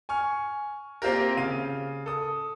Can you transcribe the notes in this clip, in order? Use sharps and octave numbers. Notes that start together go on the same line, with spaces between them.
G#5 C#6 F6
A#3 C4 F4 G4 A#4
C#3 F5 D#7
A4 D#6